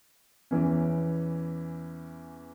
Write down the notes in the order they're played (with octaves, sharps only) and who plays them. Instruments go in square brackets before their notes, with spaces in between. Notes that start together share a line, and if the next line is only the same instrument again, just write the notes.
[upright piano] E2 E3 C#4